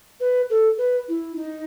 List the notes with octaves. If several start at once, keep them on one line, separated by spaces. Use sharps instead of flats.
B4
A4
B4
E4
D#4